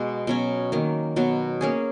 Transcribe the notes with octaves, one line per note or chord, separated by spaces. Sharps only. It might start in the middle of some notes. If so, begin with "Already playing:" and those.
Already playing: B2 G#3 B3
B2 F#3 C#4
D#3 F#3 A#3
B2 F#3 B3
A#3 C#4 G#4